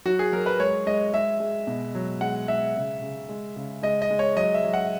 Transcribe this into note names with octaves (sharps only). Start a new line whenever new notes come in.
F#3 F#4
G#4
F#3 A#4
B4
G#3 C#5
G#3 D#5
G#3 E5
G#3
B2
F#3
G#3 F#5
G#3 E5
C#3
C#3
G#3
C#3
G#3 D#5
D#5
G#3
C#5
F#3 D#5
E5
F#3
F#5